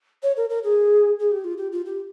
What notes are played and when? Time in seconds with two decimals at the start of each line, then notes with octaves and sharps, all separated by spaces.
0.23 C#5
0.37 A#4
0.50 A#4
0.64 G#4
1.19 G#4
1.32 G4
1.44 F4
1.58 G4
1.72 F4
1.86 G4